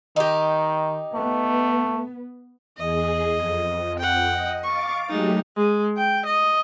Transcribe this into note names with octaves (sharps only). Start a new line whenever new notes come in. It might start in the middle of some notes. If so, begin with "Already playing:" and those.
D#3 D#4 G4
A3 B3
E2 G#4 D#5
F2
F#5 G5
D#5
F5 C#6 D6 A6
F#3 G#3 A3 D#4 G4
G#3
G5
D#5